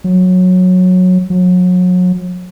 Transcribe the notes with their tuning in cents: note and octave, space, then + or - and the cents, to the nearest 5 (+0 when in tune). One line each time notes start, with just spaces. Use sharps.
F#3 -15
F#3 -35